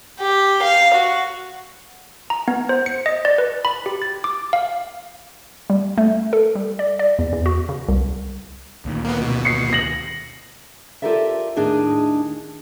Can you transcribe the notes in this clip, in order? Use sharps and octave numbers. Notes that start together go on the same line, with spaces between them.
G4
F5
F#4
A#5
B3
C5
C#7
D#5
D5
B4
B5
G4
A6
D6
F5
G3
A3
A4
G3
D5
D5
E2
E2
F#4
C#3
C2
D2 A#2 D#3
A#3 B3
B2
C7 C#7
A#6 F#7
F4 G4 A4 A#4 D5 E5
D#2 A2 D4 D#4 G#4 D#5